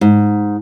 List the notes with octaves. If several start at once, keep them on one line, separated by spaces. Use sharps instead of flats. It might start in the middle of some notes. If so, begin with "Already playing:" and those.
G#2